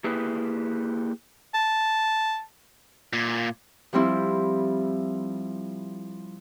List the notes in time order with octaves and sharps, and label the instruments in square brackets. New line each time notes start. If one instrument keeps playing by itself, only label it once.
[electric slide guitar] A#3 E4 G4 G#4 B4
[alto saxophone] A5
[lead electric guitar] A#2
[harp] F3 G3 C4 E4